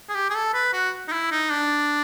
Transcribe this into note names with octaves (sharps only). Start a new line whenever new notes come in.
G#4
G4
G#4
A4
B4
F#4
D#4
E4
D#4
D4